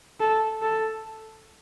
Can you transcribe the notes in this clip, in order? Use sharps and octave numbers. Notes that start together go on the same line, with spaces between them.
A4
A4